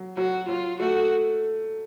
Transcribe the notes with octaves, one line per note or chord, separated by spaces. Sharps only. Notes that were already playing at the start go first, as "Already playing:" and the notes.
Already playing: F#3
F#3 F#4
F#3 F4
A3 F#4